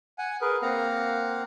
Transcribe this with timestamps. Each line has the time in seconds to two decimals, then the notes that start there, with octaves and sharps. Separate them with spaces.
0.18 F#5 G#5
0.41 G#4 A#4 B4
0.62 A#3 C4 F5 F#5 A#5